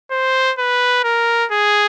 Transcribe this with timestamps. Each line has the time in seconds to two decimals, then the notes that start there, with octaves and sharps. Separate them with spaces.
0.11 C5
0.58 B4
1.04 A#4
1.51 G#4